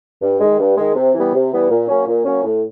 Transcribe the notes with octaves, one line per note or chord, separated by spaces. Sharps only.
G2
D#3 G#3
G2
D#3 G#3
C3
E3 G3 B3
C3
E3 G3 B3
A#2
F#3 A#3 C#4
A#2
F#3 A#3 C#4
A2